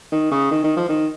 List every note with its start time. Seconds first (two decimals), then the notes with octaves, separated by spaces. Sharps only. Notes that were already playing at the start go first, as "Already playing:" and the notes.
0.12 D#3
0.31 C#3
0.51 D#3
0.64 D#3
0.77 F3
0.89 D#3